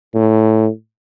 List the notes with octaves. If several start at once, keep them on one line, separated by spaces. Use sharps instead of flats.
A2